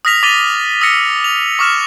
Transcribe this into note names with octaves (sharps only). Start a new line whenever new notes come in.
D#6 F6 A#6 B6 F7
D6 A6 B6 D#7 F7 G7
D#6 E6 A#6 C#7
F7
C#6 D6 F6 E7